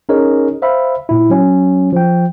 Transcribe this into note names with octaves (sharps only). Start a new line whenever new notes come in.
C#4 D#4 G#4 A#4 C#5 D#5
C5 E5 F5 B5
A#2 E4
F#3 C#4
F3 G5